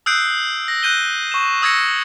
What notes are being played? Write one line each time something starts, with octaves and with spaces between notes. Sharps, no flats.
D#6 E6 F#6 G6 C7 D7
A#6
F#6 G6 D#7 G7
C#6 E7
D#6 E6 G#6 A#6 C#7